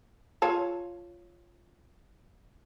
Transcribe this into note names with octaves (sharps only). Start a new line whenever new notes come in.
F4 C#5 A5